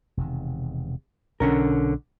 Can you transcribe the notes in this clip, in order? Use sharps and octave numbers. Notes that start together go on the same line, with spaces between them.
E1 C3 D#3
B1 D3 C#4 A#4